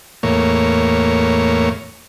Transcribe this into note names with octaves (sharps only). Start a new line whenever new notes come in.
E2 A2 A#3 C#5